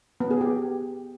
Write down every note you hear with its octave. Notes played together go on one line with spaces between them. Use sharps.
B3
G#4
G4